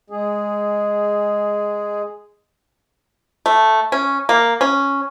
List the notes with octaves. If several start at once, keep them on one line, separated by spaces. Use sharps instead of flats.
G#3 G#4
A3
C#4
A#3
C#4